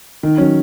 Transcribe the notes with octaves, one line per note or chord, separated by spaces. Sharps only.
D#3
F#3 C#4